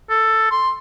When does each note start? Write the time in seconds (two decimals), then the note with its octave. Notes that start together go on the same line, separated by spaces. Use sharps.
0.10 A4
0.51 C6